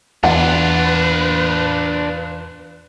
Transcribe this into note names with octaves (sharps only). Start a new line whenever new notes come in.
E2 D4 F4 B4 F#5